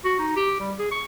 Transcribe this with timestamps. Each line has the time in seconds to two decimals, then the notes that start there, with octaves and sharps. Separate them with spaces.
0.04 F#4
0.19 D#4
0.36 G4
0.60 G3
0.79 G#4
0.91 C#6